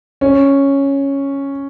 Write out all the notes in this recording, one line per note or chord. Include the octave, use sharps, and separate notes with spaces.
C#4